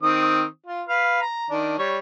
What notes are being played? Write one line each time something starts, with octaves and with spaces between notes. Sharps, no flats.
D#3 C4 D#6
F4
B4 F5
A#5
D#3 D4
G3 C#5